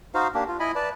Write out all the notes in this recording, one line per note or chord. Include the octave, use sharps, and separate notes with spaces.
D#4 F#4 C5 F5
A#3 D4 G4
F4
E4 D#5 G#5 B5
B4 D5 A5